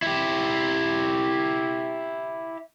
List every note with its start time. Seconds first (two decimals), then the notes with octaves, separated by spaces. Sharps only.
0.02 E4 G4